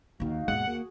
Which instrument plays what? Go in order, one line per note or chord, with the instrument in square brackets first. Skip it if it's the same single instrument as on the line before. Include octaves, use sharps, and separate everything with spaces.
[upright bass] D#2 D#3 [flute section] D#4 F#4 F5
[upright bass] D#2 [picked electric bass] G#2 B2 G#3 [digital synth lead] F#5
[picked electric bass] A#3 [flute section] F#4 G#4